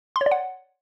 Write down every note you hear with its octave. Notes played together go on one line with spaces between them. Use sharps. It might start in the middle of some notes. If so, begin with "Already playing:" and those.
C6
C#5
D5
F#5